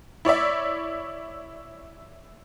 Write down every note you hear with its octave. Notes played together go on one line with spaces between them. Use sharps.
E4 C#5 D5 E5